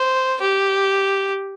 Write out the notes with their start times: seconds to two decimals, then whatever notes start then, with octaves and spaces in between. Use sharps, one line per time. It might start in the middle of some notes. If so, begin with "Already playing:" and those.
Already playing: C5
0.41 G4